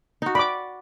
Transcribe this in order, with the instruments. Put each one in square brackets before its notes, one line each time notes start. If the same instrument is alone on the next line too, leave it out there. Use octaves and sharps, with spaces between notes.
[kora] D#4 F#4
[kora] D5 [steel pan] B5 D6